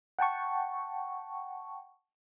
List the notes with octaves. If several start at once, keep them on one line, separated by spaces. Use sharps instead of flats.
F#5 G5 A5 C#6